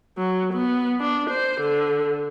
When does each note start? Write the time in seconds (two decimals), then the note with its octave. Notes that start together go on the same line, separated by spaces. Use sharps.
0.18 F#3
0.54 B3
1.00 D4
1.30 C5
1.61 D3